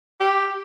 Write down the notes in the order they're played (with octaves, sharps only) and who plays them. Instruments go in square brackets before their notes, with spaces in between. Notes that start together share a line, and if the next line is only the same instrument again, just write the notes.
[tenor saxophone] G4